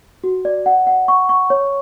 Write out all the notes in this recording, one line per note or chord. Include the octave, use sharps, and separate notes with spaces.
F#4
D5
F#5
F#5
C#6
C#6
C#5